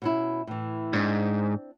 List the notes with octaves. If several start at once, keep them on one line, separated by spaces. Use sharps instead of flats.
B2 C#4 E4
A2 E3
G#2 C4 D4